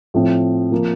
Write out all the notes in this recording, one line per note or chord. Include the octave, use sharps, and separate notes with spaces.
A2 F3 C4
F3 A#3